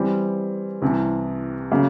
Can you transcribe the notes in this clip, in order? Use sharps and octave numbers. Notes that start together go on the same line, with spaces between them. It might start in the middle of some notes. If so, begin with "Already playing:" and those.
Already playing: E3 G3 C4
C2 C3 E3
C#3 F#3 A#3